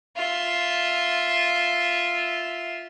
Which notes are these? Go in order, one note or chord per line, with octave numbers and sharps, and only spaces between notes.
F4 E5